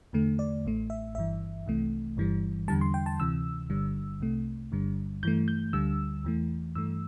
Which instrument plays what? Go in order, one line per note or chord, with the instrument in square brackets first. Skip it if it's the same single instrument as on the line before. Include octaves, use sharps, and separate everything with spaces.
[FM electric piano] E2 D3 A3
D5
A1 A2 A3
E5
G1 G2 E3 E5
C2 C3 E3 A3
G1 G2 E3 G3
E2 D3 G3 A5
C6
G5
A5
D2 C3 E3 E6
G1 G2 D3 G3
C2 C3 A3
G1 G2 D3 G3
G2 E3 A3 G6
G6
D2 D3 G3 E6
E2 E3 A3
G2 E3 A3 E6